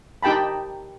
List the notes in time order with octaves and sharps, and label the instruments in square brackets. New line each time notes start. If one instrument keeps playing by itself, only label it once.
[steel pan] D#4 G4 G5 A5 B5